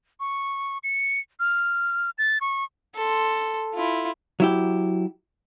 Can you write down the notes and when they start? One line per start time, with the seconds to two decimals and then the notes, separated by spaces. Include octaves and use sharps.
0.20 C#6
0.84 C#7
1.40 F6
2.18 A6
2.41 C#6
2.96 A4 C6
3.75 E4 F4
4.40 F#3 E4 G4